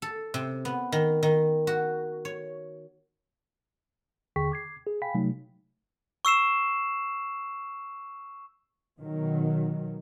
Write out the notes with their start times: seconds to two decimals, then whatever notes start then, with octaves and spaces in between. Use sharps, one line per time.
0.02 A4
0.34 C3
0.65 B3
0.92 D#3
1.23 D#3
1.67 F#4
2.25 C#5
4.36 D#2 D3 G#4 G5 C#6 B6
4.52 D6 G#6 C7
4.87 G#4
5.02 F5 G5 G#5 B5 B6
5.14 C3 F#3 A3 D#4
6.25 C#6 E6 C7 E7
8.98 B2 D#3 F#3